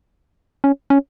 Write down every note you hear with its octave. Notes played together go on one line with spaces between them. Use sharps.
C#4
C#4